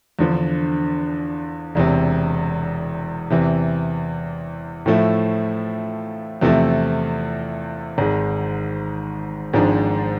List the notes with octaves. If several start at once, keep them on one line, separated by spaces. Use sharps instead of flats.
E2 D3 F3
E1 E2 C3
E2 C3 E3
A2 F3 A3 E4
E2 C3 F3 A3 E4
G#1 G#2 G#3
G#1 G#2 F3 G#3 D4